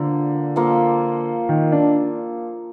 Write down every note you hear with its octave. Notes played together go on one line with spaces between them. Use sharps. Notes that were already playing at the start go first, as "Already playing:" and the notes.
Already playing: A#2 D3 F3 A#3
F3 A#3 F4 A4
D#3
D4